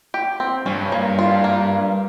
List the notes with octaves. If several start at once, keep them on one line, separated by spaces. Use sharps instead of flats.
G4
C4
G2 C#4
A#3
F4
A#3